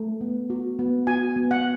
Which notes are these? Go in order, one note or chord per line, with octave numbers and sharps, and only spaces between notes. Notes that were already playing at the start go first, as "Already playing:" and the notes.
Already playing: A3
B3
F#4
B3
F#4 G#5
B3
F#5